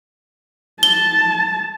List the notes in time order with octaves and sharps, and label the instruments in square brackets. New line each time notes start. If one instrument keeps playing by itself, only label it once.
[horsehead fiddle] A5 [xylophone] G7